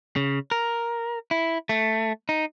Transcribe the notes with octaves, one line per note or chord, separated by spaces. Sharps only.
C#3
A#4
E4
A3
D#4